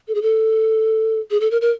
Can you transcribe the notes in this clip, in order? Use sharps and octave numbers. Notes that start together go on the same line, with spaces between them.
A4
G#4
A4
G#4
A4
A#4
A#4